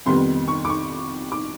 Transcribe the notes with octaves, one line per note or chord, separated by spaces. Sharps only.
F2 C3 D#3 G3 B3 C6
C#6
D6
C#6
D6